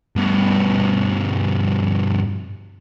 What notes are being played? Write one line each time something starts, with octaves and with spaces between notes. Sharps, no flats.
G2 B2